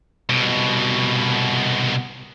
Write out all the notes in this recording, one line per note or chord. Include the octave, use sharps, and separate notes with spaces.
C2 B2